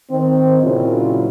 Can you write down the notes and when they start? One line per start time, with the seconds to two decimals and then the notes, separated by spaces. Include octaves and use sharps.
0.11 D#3 C4
0.63 A#2 C#3 F#3 C4 E4 F4